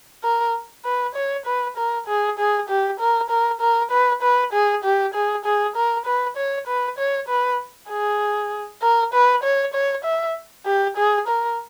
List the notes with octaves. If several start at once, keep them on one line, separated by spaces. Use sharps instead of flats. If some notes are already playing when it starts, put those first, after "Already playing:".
A#4
B4
C#5
B4
A#4
G#4
G#4
G4
A#4
A#4
A#4
B4
B4
G#4
G4
G#4
G#4
A#4
B4
C#5
B4
C#5
B4
G#4
A#4
B4
C#5
C#5
E5
G4
G#4
A#4